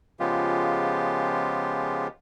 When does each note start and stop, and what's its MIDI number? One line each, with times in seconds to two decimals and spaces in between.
0.20 2.08 49
0.20 2.08 53
0.20 2.08 56
0.20 2.08 59
0.20 2.08 65
0.20 2.08 67